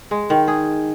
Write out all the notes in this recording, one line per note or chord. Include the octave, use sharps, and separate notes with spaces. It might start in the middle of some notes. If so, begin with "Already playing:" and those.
G#3
D#3
G#4